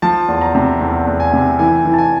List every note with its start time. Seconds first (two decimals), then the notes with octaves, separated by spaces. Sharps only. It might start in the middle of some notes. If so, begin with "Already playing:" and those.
0.02 F3 A5
0.28 E2
0.41 A#5
0.55 C3
0.81 E2
1.07 E2
1.20 G#5
1.33 C3
1.59 E3 G#5
1.85 E3
1.93 A5
1.98 G#5